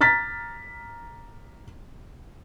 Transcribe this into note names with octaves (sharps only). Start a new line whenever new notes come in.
A#5 F6 A6 B6